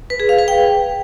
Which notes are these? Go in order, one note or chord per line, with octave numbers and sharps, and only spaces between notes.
B4
G#4
F5
B4
G5